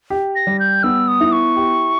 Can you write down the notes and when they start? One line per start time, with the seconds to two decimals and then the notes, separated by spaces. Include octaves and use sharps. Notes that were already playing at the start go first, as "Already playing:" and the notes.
0.10 G4
0.35 A#6
0.47 G3
0.60 G6
0.83 B3 E6
1.08 D#6
1.21 E4
1.32 C#6
1.56 G4